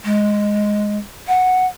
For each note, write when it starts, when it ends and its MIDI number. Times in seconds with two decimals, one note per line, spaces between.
0.04 0.98 56
1.28 1.66 78